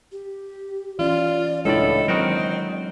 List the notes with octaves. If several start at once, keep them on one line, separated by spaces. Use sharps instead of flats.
G4
E3 C#4 F4 D5
C#2 A2 G#3 D4 E4 A4 D5 D#5
D#3 F#3 C4 F#4 A#4